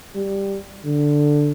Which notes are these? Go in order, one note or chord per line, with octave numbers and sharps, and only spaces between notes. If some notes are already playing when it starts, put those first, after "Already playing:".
G3
D3